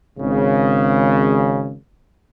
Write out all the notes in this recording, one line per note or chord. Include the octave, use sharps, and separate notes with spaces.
G#1 C#3